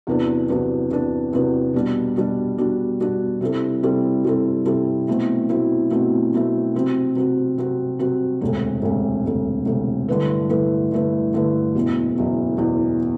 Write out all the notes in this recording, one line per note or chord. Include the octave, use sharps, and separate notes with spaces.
E2 C3 F#3 B3 D4
E2 C3 F#3 B3 D4
E2 C3 F#3 B3 D4
E2 C3 F#3 B3 D4
B2 G3 D4 F#4
B2 G3 D4 F#4
B2 G3 D4 F#4
B2 G3 D4 F#4
C3 G3 C4 E4 A4
C3 G3 C4 E4 A4
C3 G3 C4 E4 A4
C3 G3 C4 E4 A4
B2 F#3 A3 C4 E4
B2 F#3 A3 C4 E4
B2 F#3 A3 C4 E4
B2 F#3 A3 C4 E4
C3 F#3 C4 F#4
C3 F#3 C4 F#4
C3 F#3 C4 F#4
C3 F#3 C4 F#4
E1 D2 C3
E1 D2 C3
E1 D2 C3
E1 D2 C3
G2 D3 A3 E4 B4
G2 D3 A3 E4 B4
G2 D3 A3 E4 B4
G2 D3 A3 E4 B4
F#1 E2 B2
F#1 E2 B2
F#1 E2 B2